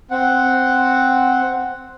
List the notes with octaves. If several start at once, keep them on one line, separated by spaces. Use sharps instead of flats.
C4 F#5